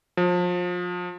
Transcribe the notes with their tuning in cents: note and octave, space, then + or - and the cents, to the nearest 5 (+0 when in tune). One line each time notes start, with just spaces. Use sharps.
F3 +30